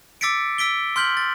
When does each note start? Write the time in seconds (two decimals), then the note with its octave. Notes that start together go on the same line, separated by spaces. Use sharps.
0.21 D6 E6 A6 B6 C#7 D7
0.58 E6 B6 D7 G7
0.96 C6 F6 G6 B6 F#7
1.17 A6